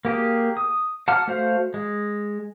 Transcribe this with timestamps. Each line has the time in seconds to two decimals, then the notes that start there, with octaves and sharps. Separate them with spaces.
0.05 A#3 G4 G#4
0.57 D#6
1.08 F#5 A5 D6 F6
1.27 A3 F#4 C5 F5
1.74 G#3